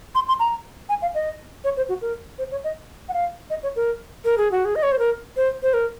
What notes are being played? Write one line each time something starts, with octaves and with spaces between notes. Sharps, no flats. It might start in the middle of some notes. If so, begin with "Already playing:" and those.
C6
C6
A#5
G#5
F5
D#5
C#5
C5
F#4
A#4
C5
C#5
D#5
F#5
F5
D#5
C#5
A#4
A#4
G#4
F#4
G#4
D#5
C#5
C5
A#4
C5
C5
A#4